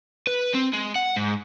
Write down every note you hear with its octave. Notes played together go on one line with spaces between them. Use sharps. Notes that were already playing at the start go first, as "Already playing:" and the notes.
B4
C4
G#3
F#5
G#2